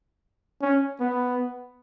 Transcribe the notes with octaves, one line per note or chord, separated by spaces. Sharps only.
C#4
B3